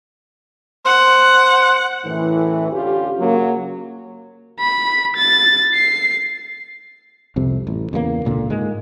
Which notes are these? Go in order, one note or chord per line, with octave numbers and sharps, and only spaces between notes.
C5 F#5
F#2 A2 E3
D2 C#4 F4 G4
C#3 F#3 A#3
B5
A6
C7
C2 F2 C3
A1
E2 C#3 F3 A#3
C#2 A#2 D3
G#2 G#3 A#3